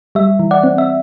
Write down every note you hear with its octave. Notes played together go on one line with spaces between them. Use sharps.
G3 E5
E3
D5 F#5
C4
E5